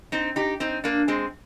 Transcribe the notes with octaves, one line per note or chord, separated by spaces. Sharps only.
C4 D#4
D#4 G4
C4 D#4
A#3 D4
G#3 C4